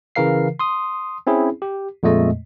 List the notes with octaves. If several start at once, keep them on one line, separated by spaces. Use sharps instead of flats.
C#3 E3 A#4 F5 C7
C6 D#6
C4 C#4 E4 G#4
G4
F2 A#2 G#3 A3 D#5